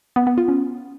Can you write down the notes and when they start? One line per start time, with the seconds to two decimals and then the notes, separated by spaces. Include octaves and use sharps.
0.16 B3
0.27 B3
0.38 F4
0.48 C#4